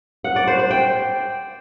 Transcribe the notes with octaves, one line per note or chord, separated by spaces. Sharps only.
F#5
D5
C5
C5
G5